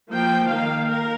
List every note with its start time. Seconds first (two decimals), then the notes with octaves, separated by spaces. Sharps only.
0.10 F3 A#3 G5
0.49 D#3 A#3 F5
0.87 A#4